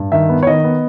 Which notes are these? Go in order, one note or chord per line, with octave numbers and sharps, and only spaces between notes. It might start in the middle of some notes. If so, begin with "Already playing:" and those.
Already playing: G2
D#3 E5
B3
C#5
D#3 D#5
B3